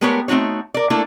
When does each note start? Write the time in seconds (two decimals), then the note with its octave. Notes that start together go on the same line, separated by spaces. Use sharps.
0.01 G#3 A3 B3 G4 A#4 C#5
0.28 A3 C4 D#4 F#4 C#5
0.74 A#4 D5
0.90 A3 A#3 D4 E4 A4